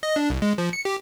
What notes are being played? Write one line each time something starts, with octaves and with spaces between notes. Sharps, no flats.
D#5
D4
C2
G#3
F3
C#7
G4